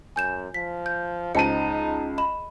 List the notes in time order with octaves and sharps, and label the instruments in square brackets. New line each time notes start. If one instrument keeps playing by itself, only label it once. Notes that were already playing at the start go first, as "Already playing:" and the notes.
[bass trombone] F#2 [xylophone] G#5 G6 E7
[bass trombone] F3 [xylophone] B6
[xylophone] G6
[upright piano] C#2 A5 D#7 [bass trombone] D#4 [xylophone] C5 D#5 C#7
[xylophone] D#5 B5 E7